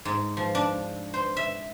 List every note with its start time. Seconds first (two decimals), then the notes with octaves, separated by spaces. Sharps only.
0.05 G#2
0.37 F3
0.55 D4
1.14 C5
1.37 E5